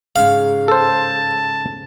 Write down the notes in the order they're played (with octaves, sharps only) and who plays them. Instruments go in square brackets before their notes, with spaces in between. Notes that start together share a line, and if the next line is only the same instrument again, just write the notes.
[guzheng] G#2 C#3 [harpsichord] F5
[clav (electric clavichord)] A4 C5 [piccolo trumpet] A5